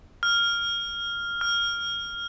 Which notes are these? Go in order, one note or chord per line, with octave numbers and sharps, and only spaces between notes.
F6
F6